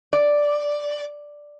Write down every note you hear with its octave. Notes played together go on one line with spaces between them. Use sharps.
D5